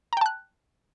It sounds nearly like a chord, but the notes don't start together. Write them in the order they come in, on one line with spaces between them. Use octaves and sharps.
A#5 G5 A5 F#6